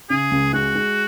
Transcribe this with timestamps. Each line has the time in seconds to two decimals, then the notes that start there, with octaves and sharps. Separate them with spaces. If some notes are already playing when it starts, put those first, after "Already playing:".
0.10 C#3 G#4
0.31 C#2
0.53 G#3 F#4
0.75 G#3